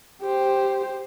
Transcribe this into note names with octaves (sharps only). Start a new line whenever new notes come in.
G4 C5